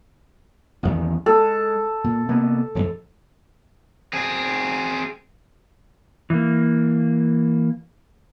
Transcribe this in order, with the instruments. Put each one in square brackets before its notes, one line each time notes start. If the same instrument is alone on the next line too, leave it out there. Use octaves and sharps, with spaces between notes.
[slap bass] A1 E2 D#3
[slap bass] G#3 [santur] A4
[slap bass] A#2
C3 A#3 B3
D1 F2
[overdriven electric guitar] C4 G#4
[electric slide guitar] E3 A#3